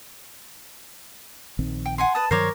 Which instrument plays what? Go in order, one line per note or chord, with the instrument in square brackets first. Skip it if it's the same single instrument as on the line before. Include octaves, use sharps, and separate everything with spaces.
[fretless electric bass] A#1 D#3 C4
[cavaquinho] G5
F#5 G#5 C6
[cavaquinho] B4 D#6 [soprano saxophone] A5
[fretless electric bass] G2 D#3 F#3 [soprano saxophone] A#4 [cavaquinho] C5 C#5 D6